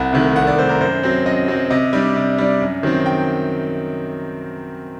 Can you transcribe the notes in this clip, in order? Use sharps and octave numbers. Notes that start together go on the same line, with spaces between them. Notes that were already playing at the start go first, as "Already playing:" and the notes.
Already playing: C2 F#5
C3 D#3 A3
C2 F#5
D5
C3 D#3 A3 C5
A#4
F#2 C5
F#3 C4
F#2 D#5
F#3 C4
C3 D#5
G3 D4
C3
G3 D4
F#2
D#3 F#3 C4
G5